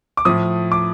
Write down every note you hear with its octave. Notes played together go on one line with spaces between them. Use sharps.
D6
A2 F3 D#6
D6